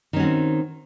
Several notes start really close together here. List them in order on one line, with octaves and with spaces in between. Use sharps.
D#3 C#4 F#4 C4